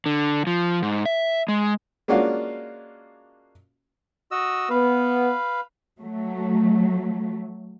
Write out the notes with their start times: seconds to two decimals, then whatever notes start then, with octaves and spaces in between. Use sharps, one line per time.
0.06 D3
0.47 F3
0.82 G#2
1.05 E5
1.48 G#3
2.08 G#3 A#3 C#4 D4 F4 F#4
4.31 F#4 D#5 E6
4.70 B3 B4 F5
6.01 F#3 A3